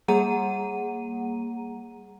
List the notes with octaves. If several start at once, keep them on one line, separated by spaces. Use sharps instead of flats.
G3 A#3 G#4 F#5 A#5 D#7